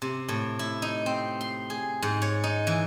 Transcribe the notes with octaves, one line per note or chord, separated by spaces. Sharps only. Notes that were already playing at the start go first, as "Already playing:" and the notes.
C3
A2
E4
D#4
C4
C6
G#4
G#2
C#5
D#4
E3